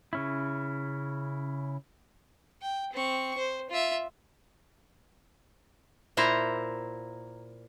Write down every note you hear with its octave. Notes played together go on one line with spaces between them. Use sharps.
C#3 C#4 E4
G5
C4 C#6
C5
F4 E5
A#2 E4 C5 A#5